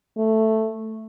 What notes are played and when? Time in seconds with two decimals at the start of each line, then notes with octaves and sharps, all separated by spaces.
0.17 A3